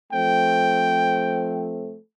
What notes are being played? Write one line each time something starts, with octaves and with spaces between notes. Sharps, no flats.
F3 A3 C4 G5